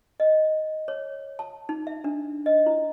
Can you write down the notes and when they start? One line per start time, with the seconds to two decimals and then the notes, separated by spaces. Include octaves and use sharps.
0.20 D#5
0.88 C#5
1.39 A5
1.69 D#4
1.87 E5
2.04 D4
2.46 D#5
2.66 E4